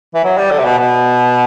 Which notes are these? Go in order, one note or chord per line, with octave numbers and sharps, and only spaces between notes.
E3
F#3
G3
D3
C3
B2
B2